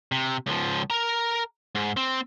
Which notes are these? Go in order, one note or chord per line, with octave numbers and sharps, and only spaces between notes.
C3
C#2 F3
A#4 A#5
G#2
C4